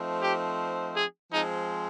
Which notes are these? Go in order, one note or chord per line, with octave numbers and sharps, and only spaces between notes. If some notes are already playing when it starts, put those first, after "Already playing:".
Already playing: F3 A3 C4 D#4
G4
G#4
F3 G#3 C4 D#4